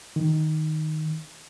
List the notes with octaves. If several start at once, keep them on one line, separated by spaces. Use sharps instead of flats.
D#3